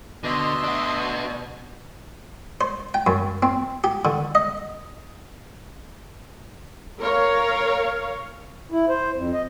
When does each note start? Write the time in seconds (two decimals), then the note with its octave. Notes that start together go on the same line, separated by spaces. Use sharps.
0.24 B2 D3 D#5 E5 C6
0.63 D4 F#4
2.61 C5
2.94 G5
3.07 F#2
3.43 C4
3.84 G4
4.05 D3
4.35 D#5
7.00 A#4 C#5 F5
8.72 E4
8.89 C5
9.16 F2
9.33 D#5